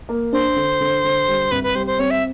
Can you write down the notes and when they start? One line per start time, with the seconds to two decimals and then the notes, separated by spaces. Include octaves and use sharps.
0.09 A#3
0.33 D4 C5
0.56 D3
0.80 D3
1.04 D3
1.28 G3
1.51 C2 B4
1.63 B4
1.75 G3 C5
1.87 C5
1.99 C4 C#5
2.11 E5